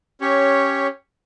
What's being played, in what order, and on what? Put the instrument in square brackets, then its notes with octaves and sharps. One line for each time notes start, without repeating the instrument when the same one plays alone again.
[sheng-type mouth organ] C#4 G4 C#5